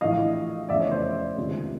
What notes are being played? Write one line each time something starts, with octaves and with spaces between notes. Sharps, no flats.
A#1 A2 E3 D#5 F5
F1 E2 C#3 D5 E5
C#5 D#5
C5 D5
C#2 C3 D#3